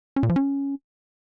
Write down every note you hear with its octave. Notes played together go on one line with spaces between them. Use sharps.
C#4
A#2
F3
C#4